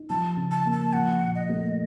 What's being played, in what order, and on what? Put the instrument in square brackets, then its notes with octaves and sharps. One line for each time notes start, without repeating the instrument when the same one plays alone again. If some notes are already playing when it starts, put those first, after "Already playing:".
Already playing: [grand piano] D#4
[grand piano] F3 [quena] A5
[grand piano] C#3
[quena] A5
[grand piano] A#3
[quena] A5
[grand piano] F3 [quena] F#5
[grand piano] A#2
[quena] D#5
[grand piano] A3